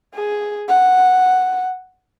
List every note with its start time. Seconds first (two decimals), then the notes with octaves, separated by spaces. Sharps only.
0.15 G#4
0.68 F#5